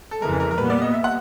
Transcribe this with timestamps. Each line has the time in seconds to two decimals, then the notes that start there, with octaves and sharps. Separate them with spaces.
0.11 A4
0.21 F2 C#3 E3 G#3 A#4
0.40 A#4
0.51 A#4
0.57 A#2 G3 B3 B4
0.70 D5
0.82 D#5
0.94 E5
1.04 F#5